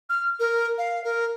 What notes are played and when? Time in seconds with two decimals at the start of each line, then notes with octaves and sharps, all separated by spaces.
0.10 F6
0.40 A#4
0.78 F5
1.04 A#4